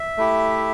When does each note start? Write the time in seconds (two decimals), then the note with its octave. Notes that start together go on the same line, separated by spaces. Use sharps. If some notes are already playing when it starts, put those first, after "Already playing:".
Already playing: E5
0.17 A3 E4 G4